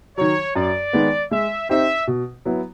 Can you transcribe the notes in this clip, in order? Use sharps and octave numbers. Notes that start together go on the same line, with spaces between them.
D#3 F#3 C#5
F#2 D5
D#3 G#3 B3
G#3 E5
C4 D#4 G4 C5 E5
B2
F#3 B3 E4